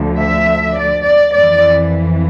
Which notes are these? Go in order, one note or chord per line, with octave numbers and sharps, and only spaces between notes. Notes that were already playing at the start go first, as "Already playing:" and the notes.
Already playing: D2 D3 F3
E5
D5
D5
F2 E3 D5